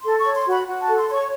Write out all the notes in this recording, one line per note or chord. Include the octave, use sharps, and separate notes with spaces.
A4 C6
C#5 C#6
C6
F#4 B5
F#4
A5
A4
C6
C#5 C6
C#6